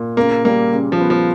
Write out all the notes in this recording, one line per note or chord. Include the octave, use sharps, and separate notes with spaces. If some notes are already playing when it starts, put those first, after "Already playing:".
Already playing: A#2
C#3 A#3
G3 A#3
C#3
F3
B3
F3